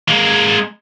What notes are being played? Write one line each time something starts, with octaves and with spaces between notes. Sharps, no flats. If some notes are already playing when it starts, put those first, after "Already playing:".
G#3 A#3